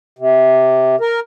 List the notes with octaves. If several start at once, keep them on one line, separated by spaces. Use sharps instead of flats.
C3
A#4